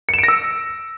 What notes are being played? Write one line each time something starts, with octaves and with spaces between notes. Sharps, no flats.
E6 A#6 C#7 D7 E7